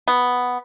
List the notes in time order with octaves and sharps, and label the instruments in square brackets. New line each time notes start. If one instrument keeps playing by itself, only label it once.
[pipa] B3